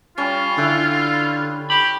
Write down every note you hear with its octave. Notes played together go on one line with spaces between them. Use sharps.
G3 C#4 F4
D3 E4
G4 B5